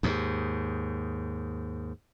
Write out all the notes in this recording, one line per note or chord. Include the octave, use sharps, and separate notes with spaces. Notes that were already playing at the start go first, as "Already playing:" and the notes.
D#2 G#2